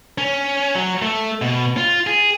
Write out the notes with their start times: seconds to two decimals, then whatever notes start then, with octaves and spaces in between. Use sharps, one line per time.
0.18 C#4
0.75 F#3
1.02 A3
1.42 B2
1.77 F4
2.07 G#4